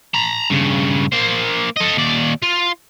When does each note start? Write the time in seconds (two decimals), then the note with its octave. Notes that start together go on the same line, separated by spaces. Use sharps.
0.14 A#5 B5
0.50 G2 C#3
1.12 A#3 C5
1.76 A4 D#5
1.97 D#2 D5
2.43 F4